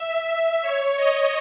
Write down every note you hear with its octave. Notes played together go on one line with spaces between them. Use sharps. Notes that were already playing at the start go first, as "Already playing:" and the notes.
Already playing: E5
C#5
D#5